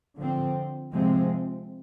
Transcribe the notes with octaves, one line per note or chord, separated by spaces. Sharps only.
D3 F3 C4
C3 F3 G#3 C4